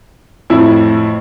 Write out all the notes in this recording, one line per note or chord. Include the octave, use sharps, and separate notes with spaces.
F2 A2 E4